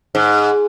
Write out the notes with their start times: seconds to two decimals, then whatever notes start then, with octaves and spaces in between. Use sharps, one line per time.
0.15 G#2